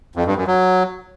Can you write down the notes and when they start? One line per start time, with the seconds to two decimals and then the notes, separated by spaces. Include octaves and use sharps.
0.16 F2
0.26 G2
0.37 F#2
0.47 F#3